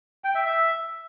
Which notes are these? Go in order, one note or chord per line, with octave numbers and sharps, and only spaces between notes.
G5
E5
E5